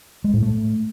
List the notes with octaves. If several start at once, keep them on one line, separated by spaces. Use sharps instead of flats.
G#3
A2
A3